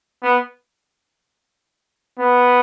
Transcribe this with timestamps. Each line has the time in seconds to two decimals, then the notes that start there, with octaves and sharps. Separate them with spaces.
0.23 B3
2.19 B3